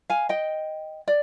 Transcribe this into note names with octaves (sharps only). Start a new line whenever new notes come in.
F5 G#5
D#5 G5
D5